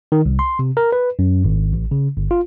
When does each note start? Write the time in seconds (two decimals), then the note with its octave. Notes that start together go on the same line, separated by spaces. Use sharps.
0.12 D#3
0.26 C2
0.39 C6
0.59 C3
0.77 A#4
0.92 B4
1.19 F#2
1.44 G#1
1.73 A1
1.91 C#3
2.17 G1
2.31 F4